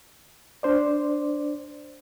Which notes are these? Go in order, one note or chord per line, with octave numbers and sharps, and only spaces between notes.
D4 C5 D5